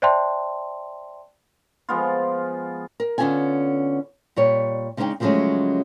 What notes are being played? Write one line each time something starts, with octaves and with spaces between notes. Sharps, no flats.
C5 D5 E5 G5 A5 C6
F3 G#3 B3 F4
A#4
D3 B3 C#4 F4 A4 G#5
A#2 G3 C#5
C#3 G#3 D4 D#4 C#5 G5
C#3 F3 F#3 G#3 A3 C#4